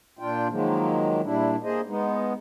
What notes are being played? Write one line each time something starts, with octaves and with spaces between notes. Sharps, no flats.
A#2 D4 F4 G5
D#3 F3 F#3 G#3 A#3
A#2 G3 D4 E4
A#3 G#4 C5 D#5
G#3 B3 D#4